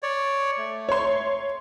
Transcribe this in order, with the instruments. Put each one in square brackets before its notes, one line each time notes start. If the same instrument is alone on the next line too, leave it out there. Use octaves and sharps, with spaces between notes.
[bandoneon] C#5 D5
A3
[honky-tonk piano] C#5 C6